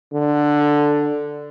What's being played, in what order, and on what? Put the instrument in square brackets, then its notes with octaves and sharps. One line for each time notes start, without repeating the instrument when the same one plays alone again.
[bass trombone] D3